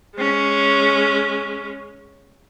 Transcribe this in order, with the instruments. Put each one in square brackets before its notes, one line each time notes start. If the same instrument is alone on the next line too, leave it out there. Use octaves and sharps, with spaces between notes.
[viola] G#3 C#4